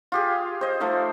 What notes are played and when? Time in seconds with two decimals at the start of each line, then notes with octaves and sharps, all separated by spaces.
0.12 F4 G4 G#4
0.61 C5 D#5
0.80 F3 A3 D#4